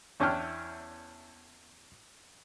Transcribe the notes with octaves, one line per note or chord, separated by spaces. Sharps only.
E2 C#4 D4 E4 G5 F6